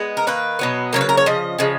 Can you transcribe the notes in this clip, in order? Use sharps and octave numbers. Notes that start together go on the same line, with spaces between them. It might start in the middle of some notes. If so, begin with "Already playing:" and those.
Already playing: G#3 B3
A#4
D#3 A#3 B4
B2 F#3 B3
C#3 F#3 A#3 C#5
B4
A#4
C#5
C#3 F3 D#5
C#3 F3 G#3